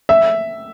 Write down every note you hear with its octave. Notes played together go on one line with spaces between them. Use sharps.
E5